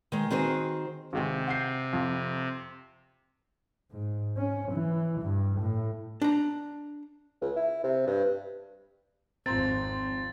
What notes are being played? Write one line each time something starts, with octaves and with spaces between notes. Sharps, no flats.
D#3 G#3
D#3 C4 F#4 G#4 A#4 C5
G#1 C3 G#3 G5
F#5 G6 C7
F2
G#2
C#4
E3
G2
A2
D4 A#5
C#2
E4
C3
G2
G#1 F2 F3 C4 C5 A#5 A6